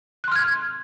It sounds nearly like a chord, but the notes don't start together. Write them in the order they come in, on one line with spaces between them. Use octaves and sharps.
F#6 C6 F6 G#6